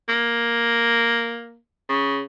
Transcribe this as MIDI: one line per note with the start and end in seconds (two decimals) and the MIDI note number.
0.09 1.58 58
1.89 2.21 49